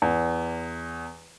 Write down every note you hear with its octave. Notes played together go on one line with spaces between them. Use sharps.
E2